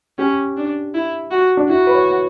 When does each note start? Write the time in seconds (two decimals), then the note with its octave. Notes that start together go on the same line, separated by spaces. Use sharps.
0.18 C#4 G4
0.57 D4
0.94 E4
1.31 F#4
1.57 D4
1.69 E4 F#4
1.87 B4
1.94 C#5